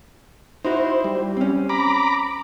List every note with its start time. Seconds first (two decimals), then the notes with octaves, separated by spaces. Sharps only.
0.65 D#4 E4 F#4 C5
1.04 G3
1.37 C4 C#4
1.69 A#5 B5 D6